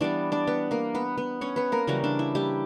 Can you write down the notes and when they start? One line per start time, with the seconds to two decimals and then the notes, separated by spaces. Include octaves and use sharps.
0.01 E3 G3 B3 D4 D5
0.32 D4 D5
0.47 B3 B4
0.71 A#3 A#4
0.95 B3 B4
1.18 B3 B4
1.41 C#4 C#5
1.56 B3 B4
1.72 A#3 A#4
1.87 C#3 E3 F#3 G3 C#4 F#4
2.04 D4
2.19 E4
2.35 G3 G4